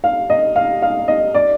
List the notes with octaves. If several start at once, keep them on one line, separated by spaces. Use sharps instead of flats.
F5
D#5
F5
F5
D#5
D5